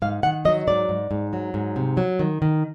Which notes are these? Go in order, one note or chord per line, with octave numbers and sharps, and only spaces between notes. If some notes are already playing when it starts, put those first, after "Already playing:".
G#2 F5
D#3 F#5
F#3 D#5
G#2 D5
G#2
G#2
F#3
G#2
C3
F#3
D#3
D#3